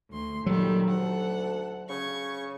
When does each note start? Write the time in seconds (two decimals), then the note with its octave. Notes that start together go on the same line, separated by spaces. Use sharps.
0.10 D2 C6
0.46 A#2 D#3 F#3 G3 A4
0.91 D2 A4 F#5
1.90 C#3 C#6 G#6